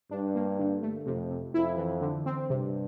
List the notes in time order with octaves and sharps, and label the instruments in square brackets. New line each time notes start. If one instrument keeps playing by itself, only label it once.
[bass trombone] G2 [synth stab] D4
[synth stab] A#3
D3
A3
[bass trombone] F2 [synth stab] C3
[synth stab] C3
[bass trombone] F2 [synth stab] E4
[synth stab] E3
D3
C4
[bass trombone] G2 [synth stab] C3